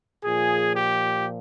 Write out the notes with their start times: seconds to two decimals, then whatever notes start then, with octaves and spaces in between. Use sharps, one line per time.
0.24 A#2 F3 G#4
0.74 G4